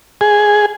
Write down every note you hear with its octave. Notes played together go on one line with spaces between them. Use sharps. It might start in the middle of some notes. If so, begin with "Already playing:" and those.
G#4